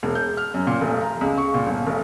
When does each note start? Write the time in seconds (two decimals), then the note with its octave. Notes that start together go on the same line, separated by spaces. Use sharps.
0.03 E1
0.15 G6
0.37 F6
0.54 F#2
0.67 A#2
0.81 F1
1.01 A#5
1.21 C#2
1.38 C#6
1.54 A#2
1.67 G1
1.86 F1